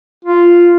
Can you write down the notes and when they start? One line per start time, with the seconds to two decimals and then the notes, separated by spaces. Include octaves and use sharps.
0.25 F4